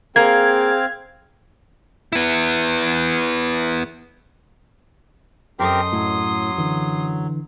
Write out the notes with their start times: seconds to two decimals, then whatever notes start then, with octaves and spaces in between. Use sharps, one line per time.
0.16 A#3 C4 G#4 F5 G#6
2.13 B3 E4
5.59 F#2 C4 G4 A4 A#4 D#5 C6 D#6
5.93 A2 F#3
6.58 D3 E3